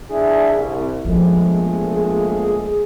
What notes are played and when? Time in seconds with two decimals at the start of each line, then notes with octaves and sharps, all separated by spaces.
0.10 D4 E4 G#4
0.53 C2
1.05 A#1 F3 G#3 A3 B3
1.92 G#4